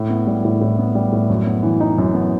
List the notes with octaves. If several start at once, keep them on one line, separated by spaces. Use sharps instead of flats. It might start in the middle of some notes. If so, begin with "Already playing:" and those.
Already playing: A2
B3
G3
A2
A2
B3
G3
A2
F#2
B3
E3
D#4
F#2
B3